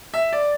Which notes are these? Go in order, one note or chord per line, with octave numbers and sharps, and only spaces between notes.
E5
D5